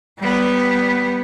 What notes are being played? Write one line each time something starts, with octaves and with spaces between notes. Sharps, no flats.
G3 B3